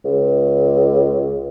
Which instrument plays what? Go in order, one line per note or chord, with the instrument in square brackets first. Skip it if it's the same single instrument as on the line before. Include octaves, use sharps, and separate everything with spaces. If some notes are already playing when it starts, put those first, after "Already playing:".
[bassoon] C#2